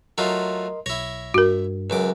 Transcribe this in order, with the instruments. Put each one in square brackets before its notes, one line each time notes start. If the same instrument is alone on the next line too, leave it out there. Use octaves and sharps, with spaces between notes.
[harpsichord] F#3 A3 F4 [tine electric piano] A#4 D#5 C6
[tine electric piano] B1 A#6 [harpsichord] E4 C#5
[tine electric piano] G2 [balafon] F#4 A#4
[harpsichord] C#2 F#2 D6